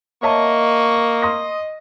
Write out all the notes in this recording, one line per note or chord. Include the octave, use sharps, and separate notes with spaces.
A#3 C#5 D#5 E5 A5 C#6
C6 D#6 A#6